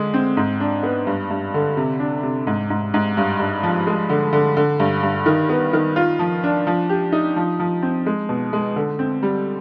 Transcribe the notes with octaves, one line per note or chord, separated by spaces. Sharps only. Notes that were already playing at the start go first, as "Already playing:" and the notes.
Already playing: D3 G#3
C4
G#2
D4
B3
G2
G2
D3
C3
D4
C3
G#2
G#2
G#2
G2
G2
F3
G#3
D3
D3
D3
G2
G2
D#3
B3
D#3
F4
F3
D4
F3
G4
D#4
F3
F3
C4
G#3
B2
G#3
D3
C4
G3